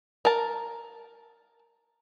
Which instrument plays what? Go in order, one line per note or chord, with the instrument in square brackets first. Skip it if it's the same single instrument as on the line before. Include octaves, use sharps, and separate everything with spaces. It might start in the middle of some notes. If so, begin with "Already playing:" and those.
[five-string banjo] A#4 A5